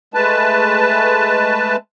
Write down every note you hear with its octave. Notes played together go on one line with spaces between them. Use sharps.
G#3 A3 B4 A5